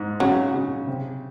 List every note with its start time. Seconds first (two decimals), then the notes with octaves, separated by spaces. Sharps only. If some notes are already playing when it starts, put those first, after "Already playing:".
Already playing: G#2
0.20 C#3 F#3
0.54 C#3
0.87 C3